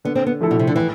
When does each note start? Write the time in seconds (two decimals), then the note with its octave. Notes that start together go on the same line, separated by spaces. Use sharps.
0.05 D3 B3
0.15 C4
0.26 B3
0.41 F3 A3 E4 A4
0.51 B2
0.59 C3
0.67 D3
0.76 A2 E3